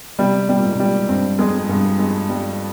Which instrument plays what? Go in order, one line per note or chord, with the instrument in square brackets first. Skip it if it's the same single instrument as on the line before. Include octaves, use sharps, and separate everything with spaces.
[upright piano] C3 [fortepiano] G3
[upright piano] C3 [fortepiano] G3
[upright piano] A#2
G#2
A#2
[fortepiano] G3
[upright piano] G2 [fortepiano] C4
[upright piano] F2 [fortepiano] G#3
[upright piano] G2 [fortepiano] G#3
[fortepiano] G#3
G3